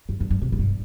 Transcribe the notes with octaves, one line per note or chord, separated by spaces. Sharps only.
G2
G2
G2
C3
A2
G2